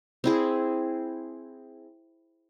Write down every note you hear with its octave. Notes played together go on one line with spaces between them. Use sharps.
C4 E4 G#4